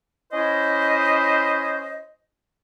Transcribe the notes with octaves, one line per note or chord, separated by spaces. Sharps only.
C#4 E4 C5 D#5